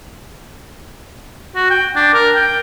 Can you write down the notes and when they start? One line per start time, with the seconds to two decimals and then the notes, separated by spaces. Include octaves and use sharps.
1.55 F#4
1.70 G5
1.96 D4
2.14 A#4
2.35 G5